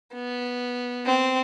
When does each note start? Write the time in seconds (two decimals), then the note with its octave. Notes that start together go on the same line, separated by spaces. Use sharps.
0.14 B3
1.06 C4